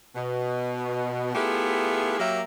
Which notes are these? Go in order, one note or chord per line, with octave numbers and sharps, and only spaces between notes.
B2
A3 B3 E4 F4 G4 G#4
F#3 A#3 G4 A#4 E5